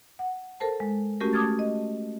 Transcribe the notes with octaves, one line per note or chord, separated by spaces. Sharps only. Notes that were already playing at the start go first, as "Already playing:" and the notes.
F#5
A4 A#4 C5 A5
G#3
A3 C#4 F#4 G4 A#4
A5 D6 D#6 F6 G#6 A6
D#5